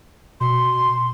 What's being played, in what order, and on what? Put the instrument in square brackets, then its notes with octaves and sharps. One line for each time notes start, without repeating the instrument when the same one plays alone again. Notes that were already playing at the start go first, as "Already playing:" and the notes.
[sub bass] B2 [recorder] C6